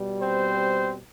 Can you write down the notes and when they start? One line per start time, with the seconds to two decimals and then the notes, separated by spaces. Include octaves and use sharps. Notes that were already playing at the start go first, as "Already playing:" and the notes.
Already playing: B2 G3
0.20 C4 C5